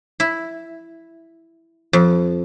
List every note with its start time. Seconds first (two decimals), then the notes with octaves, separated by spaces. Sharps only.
0.20 E4
1.93 F2